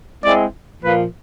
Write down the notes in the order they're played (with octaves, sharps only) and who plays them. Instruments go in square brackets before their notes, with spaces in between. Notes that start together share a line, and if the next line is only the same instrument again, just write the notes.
[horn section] G#3 C4 E4 [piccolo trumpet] D5
[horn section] A#2 F3 A#3 [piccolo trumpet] B4